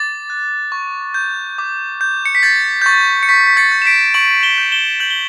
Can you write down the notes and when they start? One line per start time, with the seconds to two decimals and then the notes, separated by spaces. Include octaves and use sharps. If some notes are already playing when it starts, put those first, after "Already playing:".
Already playing: D6 A6
0.30 F#6
0.72 C#6
1.14 G6
1.58 D6
2.01 G6
2.26 C#7
2.35 B6
2.43 G6 A6
2.82 G6
2.86 C#6 A6
3.23 C#7
3.29 C#6 B6
3.47 B6
3.57 A6 C#7
3.72 G6
3.82 E7
3.85 B6 D7
4.14 C#6 D7 F#7
4.43 E7 G7
4.58 G6
4.72 E7 G7
5.00 G6 F#7
5.11 G7